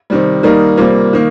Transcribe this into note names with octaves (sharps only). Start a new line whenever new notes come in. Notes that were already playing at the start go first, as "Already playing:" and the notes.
C3 D#3 G3
D#3 G3 A#3 D#4 A#4
C3 G3 A#3 F4
D#3 A#3